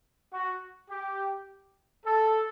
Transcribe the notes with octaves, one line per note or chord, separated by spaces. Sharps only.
F#4
G4
A4